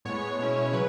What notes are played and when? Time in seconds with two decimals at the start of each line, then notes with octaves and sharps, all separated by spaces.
0.05 A2 G#3 B3 C#5
0.39 B2 G#3 C#4 E4
0.72 C#3 F#3 B4